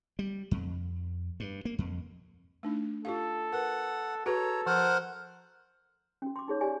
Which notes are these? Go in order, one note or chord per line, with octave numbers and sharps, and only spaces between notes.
G3
F2
G2
A#3
F2
A3 D4 D#4
F4 G4 A4 F5
A#4 B4 F#5
F#4 G#4 A4 B4 C#5 A#5
F3 A#4 C5 F#5
C#4 F#4
C6 D6
D#4 G#4 C#5
G4 D5 F5 G#5